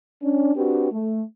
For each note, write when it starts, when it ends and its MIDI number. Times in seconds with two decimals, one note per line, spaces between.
0.23 0.54 61
0.23 0.54 62
0.56 0.90 60
0.56 0.90 62
0.56 0.90 66
0.56 0.90 67
0.56 0.90 71
0.92 1.23 57